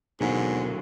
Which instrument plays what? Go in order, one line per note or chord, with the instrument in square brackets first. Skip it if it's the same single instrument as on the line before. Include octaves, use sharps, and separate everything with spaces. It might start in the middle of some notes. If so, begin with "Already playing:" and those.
[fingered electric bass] D#1 B2 [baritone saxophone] G#2 [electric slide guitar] D3 F#3 A#3